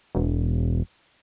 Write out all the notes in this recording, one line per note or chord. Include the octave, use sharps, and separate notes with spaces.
E1